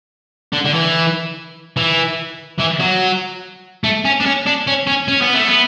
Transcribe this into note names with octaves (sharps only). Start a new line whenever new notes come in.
D3
D3
E3
E3
E3
F#3
A3
C#4
D4
C#4
D4
C#4
C#4
C#4
B3
A3
B3